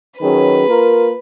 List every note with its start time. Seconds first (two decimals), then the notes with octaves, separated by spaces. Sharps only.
0.20 D#3 F#3 C#4 G#4 B4
0.67 A#3 F4 A#4